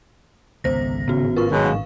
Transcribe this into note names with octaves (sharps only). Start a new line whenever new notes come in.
G#1 C#2 C3 B3 C5 A#6
G#1 A2 C#3 B3 C#4 F#4
F4 A#4 B4 C#6
B2 D#3 F#3 G#3
F5